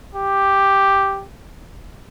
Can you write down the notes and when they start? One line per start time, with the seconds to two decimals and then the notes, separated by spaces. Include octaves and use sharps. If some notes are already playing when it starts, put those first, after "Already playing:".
0.15 G4